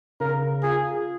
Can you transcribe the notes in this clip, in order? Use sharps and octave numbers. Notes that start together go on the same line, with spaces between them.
C#3 A#4
F4 G#4